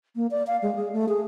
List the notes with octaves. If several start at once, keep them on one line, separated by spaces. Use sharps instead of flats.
A#3
D5
F5
G#3
G#4
A3
G#4